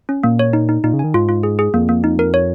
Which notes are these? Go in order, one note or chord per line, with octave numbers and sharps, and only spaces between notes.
C#4
A#2 A#3
C#5
D#4
D#4
A#2 D#4
C#3
D#3 G#5
G#2 F4
F4
G#4
G#4
F2 A#3
A#3
D#4
A#4
C#5